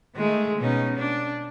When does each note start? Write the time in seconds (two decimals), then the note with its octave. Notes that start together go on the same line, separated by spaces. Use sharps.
0.15 D#3 G#3 A3
0.58 B2 C#4 D#4
0.97 D4